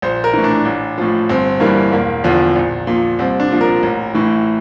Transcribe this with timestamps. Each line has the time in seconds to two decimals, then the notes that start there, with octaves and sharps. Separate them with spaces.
0.02 A#1 C5
0.24 A#4
0.33 A2 E3
0.44 D4
0.65 A1
0.98 A2 F3
1.29 G1 C4
1.60 G2 E3 G3 A#3
1.92 E1 A#3
2.24 E2 D3 F3
2.56 A#1
2.87 A#2 F3
3.19 C2 C4
3.40 D4
3.51 A#2 F3
3.61 A#4
3.83 A1
4.14 A2 E3